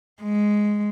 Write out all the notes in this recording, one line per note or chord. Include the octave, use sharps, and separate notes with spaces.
G#3